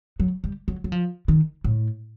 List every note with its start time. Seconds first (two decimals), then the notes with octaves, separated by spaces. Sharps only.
0.20 F#3
0.44 G3
0.68 F#3
0.84 F#3
0.92 F3
1.28 D#3
1.64 A2